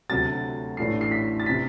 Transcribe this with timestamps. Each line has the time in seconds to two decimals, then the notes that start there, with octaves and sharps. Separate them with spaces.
0.09 D2 C3 F#3 A6
0.77 A1 A2 E3 A3 D4 C7
1.01 C7
1.11 B6
1.40 A6
1.46 C3 E3 B6